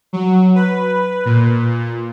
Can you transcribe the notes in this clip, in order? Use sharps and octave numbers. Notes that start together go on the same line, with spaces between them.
F#3
B4
A#2